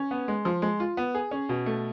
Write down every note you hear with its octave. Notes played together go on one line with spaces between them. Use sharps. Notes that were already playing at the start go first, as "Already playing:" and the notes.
Already playing: C#4
B3
G#3
F3
G#3
F4
B3
G#4
C#4
B2
A3